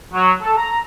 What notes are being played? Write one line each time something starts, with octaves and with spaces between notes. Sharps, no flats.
F#3
A4
A#5